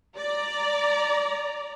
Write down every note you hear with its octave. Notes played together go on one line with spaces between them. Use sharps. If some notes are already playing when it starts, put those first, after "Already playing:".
D5 A#5